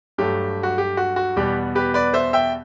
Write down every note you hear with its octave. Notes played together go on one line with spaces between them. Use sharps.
G2 F#3 A3 G4
F#4
G4
F#4
F#4
E2 B2 G3 B3 G4
G4 B4
B4 D5
C5 E5
E5 G5